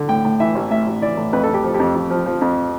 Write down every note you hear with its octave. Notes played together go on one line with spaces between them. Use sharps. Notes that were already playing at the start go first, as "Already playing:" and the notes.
Already playing: D3
A2 G5
A2
E3 E5
A1
A2 E5
A1
E3 D5
A2
F2 B4
A4
F2
G4
F3
G4
F2
F2
F3
F3
F2